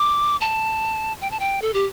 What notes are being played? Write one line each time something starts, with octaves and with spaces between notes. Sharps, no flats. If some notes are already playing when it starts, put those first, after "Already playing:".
Already playing: D6
A5
G5
A5
G5
A4
G4